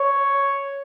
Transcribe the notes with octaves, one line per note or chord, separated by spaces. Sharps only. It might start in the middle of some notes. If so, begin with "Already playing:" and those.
Already playing: C#5